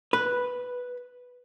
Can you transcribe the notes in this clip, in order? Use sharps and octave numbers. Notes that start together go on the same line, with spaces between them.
B4